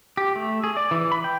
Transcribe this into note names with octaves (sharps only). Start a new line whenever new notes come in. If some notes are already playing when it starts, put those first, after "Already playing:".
G4
A3
G#4
D5
E3
B5
G5